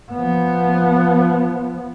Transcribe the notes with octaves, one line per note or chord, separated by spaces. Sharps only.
F3 B3